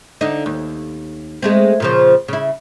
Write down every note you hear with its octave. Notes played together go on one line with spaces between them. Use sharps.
D3 D#4
D#2
G#3 A3 C4
A#2 C#3 F3
C#3 E4